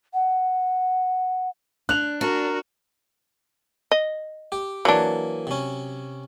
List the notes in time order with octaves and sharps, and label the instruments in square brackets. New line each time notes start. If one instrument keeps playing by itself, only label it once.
[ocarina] F#5
[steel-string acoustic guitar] D4 [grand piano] F#6 F7
[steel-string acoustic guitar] D4 [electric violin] F#4 [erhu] A#4
[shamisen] D#5
[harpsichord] G4
[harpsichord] E3 A#3 [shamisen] F#3 D4
[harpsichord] C3 C#4